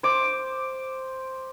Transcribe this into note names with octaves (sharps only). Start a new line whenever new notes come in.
C5 D6